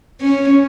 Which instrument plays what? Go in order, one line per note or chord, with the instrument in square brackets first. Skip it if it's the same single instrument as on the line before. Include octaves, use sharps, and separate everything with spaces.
[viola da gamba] C#4